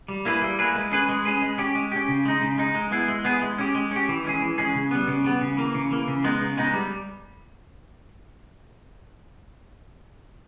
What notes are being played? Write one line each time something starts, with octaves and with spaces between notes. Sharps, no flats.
G3
A#3 E4 G#4 B4
G3
A#3 E4 G#4 B4
G#3
C#4 G#4 B4
G#3
C#4 G#4 B4
G#3
C#4 G4
G#3
C#4 G4
C#3
G#3 D#4
C#3
G#3 D#4
G#3
B3 E4 G#4
G#3
B3 E4 G#4
G#3
C#4 G4
G#3
C#4 G4
E3
G#3 C#4 G#4
E3
G#3 C#4 G#4
C#3
G3 B3
C#3
G3 B3
C#3
E3 A#3
C#3
E3 A#3
C#3
G#3 B3 D#4
C#3
G#3 B3 D#4
G3